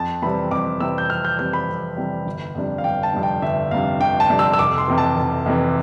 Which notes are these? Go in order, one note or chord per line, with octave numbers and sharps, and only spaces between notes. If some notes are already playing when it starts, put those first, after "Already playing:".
Already playing: F2 A5
C3 E3 G3 C4 B5
F2 D6
C3 E3 G3 C4 E6
G6
F2 F6
G6
C3 E3 G3 C4 G6
B5
F2
C3 E3 G3 C4
G1
F2 C3 G3 D4
F5
G1 G5
A5
F2 C3 G3 D4
G5
G1 E5
F2 C3 G3 D4 F5
G1 G5
A5
F2 C3 G3 D4
E6
E6
F1 D6
C6
F2 C3 E3
A5
F1
F2 C3 E3